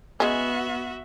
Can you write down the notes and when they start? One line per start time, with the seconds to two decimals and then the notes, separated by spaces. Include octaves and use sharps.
0.20 G#3 B3 C#4 F#4 E5